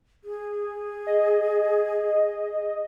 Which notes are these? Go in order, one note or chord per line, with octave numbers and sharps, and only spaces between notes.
G#4
D#5